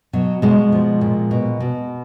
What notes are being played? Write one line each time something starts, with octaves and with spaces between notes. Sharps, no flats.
B2 F#3
B2 G#3
F3
A#2
B2
B2